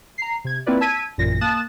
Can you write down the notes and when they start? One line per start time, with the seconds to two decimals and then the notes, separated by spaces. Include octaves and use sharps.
0.18 A#5 C7
0.44 C3 G#6
0.66 A#3 C4 E4 F4 B4 D5
0.81 A5 E6 G#6 B6 D#7
1.18 A1 F#2 A#2 A#6
1.41 A#3 A5 D#6 F#6 A6 E7